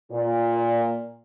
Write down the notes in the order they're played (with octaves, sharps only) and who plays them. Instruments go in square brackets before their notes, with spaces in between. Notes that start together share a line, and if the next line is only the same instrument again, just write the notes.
[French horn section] A#2